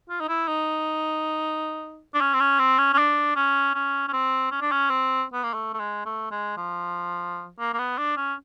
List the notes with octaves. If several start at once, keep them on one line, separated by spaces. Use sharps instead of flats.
F4
D#4
E4
D#4
D4
C#4
C4
C#4
C4
C#4
C#4
D4
C#4
C#4
C#4
C4
C#4
D4
C#4
C4
B3
A#3
A3
A3
G#3
A3
G#3
F3
A#3
A#3
B3
D4
C#4